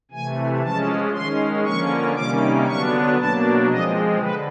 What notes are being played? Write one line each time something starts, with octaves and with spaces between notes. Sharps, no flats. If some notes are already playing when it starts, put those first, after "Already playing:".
C3 E3 A3 G#5
F3 G#3 C#4 A5
D#3 G#3 C#4 C6
D3 F3 A#3 C#4 C#6
C3 D#3 G3 A#3 C#4 D6
D3 F#3 B3 D4 C#6
B2 F#3 A#3 D4 A5
F3 G#3 C4 D#5
D3 B4